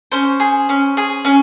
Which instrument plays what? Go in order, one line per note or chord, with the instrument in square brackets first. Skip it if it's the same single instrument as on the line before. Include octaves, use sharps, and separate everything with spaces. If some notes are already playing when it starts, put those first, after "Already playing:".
[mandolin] C#4 C5
G#4
C#4
G#4
C#4